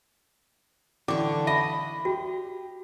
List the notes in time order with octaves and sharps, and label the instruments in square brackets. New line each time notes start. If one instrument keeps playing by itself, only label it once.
[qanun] D3 C#6 [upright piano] E3 [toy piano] C#4 D6
[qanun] D#5 [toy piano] E5 [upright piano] B5
[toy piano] F#4 [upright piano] G4